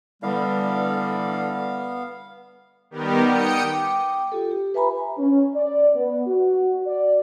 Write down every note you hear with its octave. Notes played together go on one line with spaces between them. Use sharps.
D3 E3 G3 B3 F5
D#3 G3 B3 G4 A#4
G5 D#6 C#7
G5 D6
F4 G4 A4
G4
B4 E5 G#5 A#5 B5
C#4
D5
B3
F#4
D5